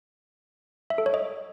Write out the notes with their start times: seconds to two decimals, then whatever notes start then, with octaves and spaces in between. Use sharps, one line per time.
0.90 E5
0.98 A4
1.06 C#5
1.14 D#5